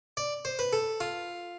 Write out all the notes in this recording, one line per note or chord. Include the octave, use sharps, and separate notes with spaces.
D5
C5
B4
A4
F4